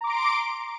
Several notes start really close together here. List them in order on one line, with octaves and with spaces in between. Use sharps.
A#5 D6 C6 D7